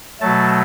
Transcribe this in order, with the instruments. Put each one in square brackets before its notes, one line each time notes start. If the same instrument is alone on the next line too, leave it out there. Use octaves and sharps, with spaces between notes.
[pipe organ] B2 F#3 A3 A5